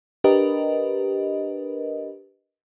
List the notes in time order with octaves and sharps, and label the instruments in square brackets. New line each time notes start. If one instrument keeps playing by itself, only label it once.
[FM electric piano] D4 G4 A#4 B4 D#5